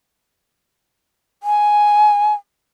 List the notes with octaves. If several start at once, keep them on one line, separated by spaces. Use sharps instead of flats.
G#5